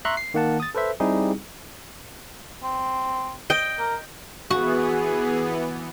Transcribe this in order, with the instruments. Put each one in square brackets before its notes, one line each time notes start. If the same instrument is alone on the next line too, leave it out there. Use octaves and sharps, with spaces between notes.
[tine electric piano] E5 A#5 C6 C#6 F#6
C7
D#3 A#3 F#5 A5
D#6 A6
A4 B4 C5 E5
G3 C4 D#4 E4 G4 G#4
[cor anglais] C4
[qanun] D#5 G5
[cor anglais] A#4
[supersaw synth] E3 B3 [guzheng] F#4 [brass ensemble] G#4